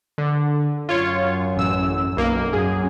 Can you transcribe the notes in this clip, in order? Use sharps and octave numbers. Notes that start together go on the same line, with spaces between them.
D3
F#2 F4 C#5
A1 E6
B1 A#3
F#2 G#4